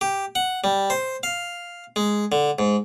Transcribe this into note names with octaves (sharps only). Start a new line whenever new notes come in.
G4
F#5
G3
C5
F5
G#3
D3
G#2